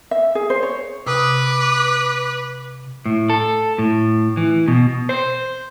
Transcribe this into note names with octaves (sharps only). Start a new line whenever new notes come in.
E5
G#4
C5
C#5
C3 B4 D6 D#6
A2
A4
A2
E3
B2
C5